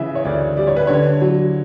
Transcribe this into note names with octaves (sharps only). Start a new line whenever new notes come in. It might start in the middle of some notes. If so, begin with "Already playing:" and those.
Already playing: C#3 E3 E5
C#5
D2 D5
G3 D5
C#5
B4
D3 C#5
F#3